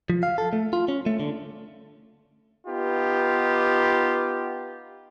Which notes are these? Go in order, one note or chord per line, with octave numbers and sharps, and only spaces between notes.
F3
F5
A4
A3
F4
C#4
A3
D3
B3 D#4 F4 G4